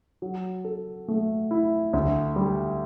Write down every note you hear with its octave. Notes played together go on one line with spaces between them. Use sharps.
F#3
A4
A3
E4
D2
G3